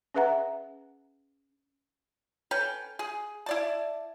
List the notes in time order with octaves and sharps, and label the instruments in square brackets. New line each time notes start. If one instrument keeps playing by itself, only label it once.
[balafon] C#4 G#4 B4 E5 F#5 A#5
[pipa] C#4 A4 B4 G5
G#4
E4 D5 A5